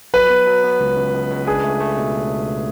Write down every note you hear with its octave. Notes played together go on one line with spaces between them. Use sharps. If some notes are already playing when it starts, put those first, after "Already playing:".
F#3 B4
B3
F#3
B3
C#2
C#2
C#2
C#2
D4 G#4
A3
A3
B2